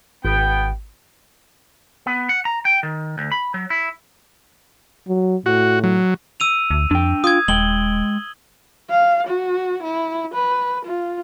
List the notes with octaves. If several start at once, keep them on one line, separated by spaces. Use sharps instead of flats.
G#1 B3 G5
B3
F#5
A#5
G5
D#3
D2
B5
F#3
E4
F#3
A2 F#4
F#3
E6 D#7 F7
D2
F2 D4 G5
F4 D#6 G#6
D#1 G#3 G5 F#7 G7
F5
F#4
E4
B4
F4